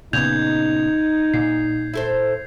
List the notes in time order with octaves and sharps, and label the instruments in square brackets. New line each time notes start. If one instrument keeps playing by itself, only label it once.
[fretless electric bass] A#2 C#3 B3 [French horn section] D#4 [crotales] G6 G#6 F7
[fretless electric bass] A#2 [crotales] C7
[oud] E4 A4 C5